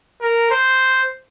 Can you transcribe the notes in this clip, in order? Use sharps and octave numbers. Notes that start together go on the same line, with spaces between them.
A#4
C5